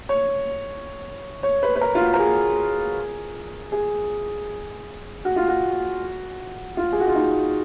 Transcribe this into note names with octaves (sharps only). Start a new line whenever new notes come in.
C#5
C#5
B4
B4
A#4
F4
F#4
A#4
G#4
G#4
F#4
F4
F#4
F4
G#4
F#4
F4
D#4